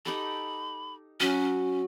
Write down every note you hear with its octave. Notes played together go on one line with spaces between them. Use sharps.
D#4 G4 A4 B5
F#3 C#4 F#4